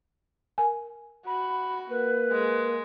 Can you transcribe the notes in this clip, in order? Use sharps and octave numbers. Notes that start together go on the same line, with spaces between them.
A#4 G#5
F#4 B5
A#3 B4
G#3